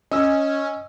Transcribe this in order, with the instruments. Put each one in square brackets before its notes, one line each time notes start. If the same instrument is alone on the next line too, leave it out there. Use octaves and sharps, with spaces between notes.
[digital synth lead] C#4 [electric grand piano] D#5 E6